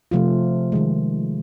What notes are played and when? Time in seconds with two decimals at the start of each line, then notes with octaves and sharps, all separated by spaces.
0.11 C3 F3 A3 F4
0.72 D#3 G#3